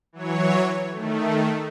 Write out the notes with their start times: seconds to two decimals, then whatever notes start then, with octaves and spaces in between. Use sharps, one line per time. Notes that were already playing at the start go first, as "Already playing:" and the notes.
0.13 E3 F#3 C#5
0.91 D#3 A3